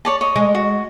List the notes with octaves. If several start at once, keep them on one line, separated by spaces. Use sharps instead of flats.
C#5 D5 A5
C#5 D#5
G#3
F#4